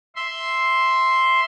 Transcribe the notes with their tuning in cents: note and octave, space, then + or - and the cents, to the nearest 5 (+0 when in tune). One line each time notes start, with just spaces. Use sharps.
E5 +0 C6 +0